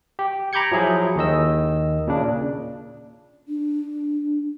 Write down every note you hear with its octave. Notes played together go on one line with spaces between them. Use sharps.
G4
A#5 B5 D6 G6 G#6 C#7
F3 F#3 E4 G#4
D#2 D#3 D#5 E6
A#2 C#3 D4
D4